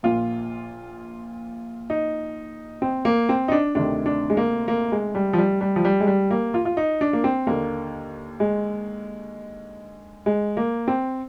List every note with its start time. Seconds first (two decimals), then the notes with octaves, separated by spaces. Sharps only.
0.03 A#1 A#2 F4
1.90 D#4
2.82 C4
3.05 A#3
3.29 C4
3.48 D#4
3.52 D4
3.75 D2 C3 D#3 D4
4.06 D4
4.30 G#3
4.37 A#3
4.68 A#3
4.92 G#3
5.15 G3
5.33 F3
5.38 G3
5.61 G3
5.76 F3
5.85 G3
6.00 G#3
6.07 G3
6.31 A#3
6.54 F4
6.65 F4
6.77 D#4
7.01 D4
7.13 A#3
7.24 C4
7.47 D#2 D3 A#3
8.40 G#3
10.26 G#3
10.57 A#3
10.88 C4